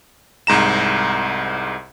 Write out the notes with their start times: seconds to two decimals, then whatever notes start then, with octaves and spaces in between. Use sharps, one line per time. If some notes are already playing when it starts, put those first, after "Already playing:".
0.47 C2 G#2 A#5 E7